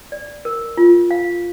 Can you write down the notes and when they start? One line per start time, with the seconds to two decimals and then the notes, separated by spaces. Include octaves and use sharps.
0.12 D5
0.45 A#4
0.77 F4
1.11 F5